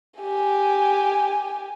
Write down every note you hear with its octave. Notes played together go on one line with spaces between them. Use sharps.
G4 G#5